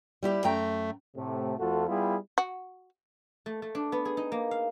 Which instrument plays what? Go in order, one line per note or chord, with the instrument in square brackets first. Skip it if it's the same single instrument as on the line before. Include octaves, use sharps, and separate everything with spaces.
[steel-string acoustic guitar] G3 E4 G4
[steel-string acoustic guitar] F#2 G5 A#5 [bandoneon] A3
[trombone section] A2 C3 A3
F2 A3 F4 F#4 A4
G3 B3 E4 F4 G4 G#4
[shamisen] F#4
[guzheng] A3
A3
D4
B3
G#4
D#4
A#3
F5